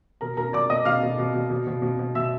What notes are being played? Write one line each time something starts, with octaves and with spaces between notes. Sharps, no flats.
B2 A#4 A#5
B2 A#4 A#5
B2 D5 D6
B2 D#5 D#6
B2 F5 F6
B2
B2
B2
B2
B2
B2
B2
B2 E5 E6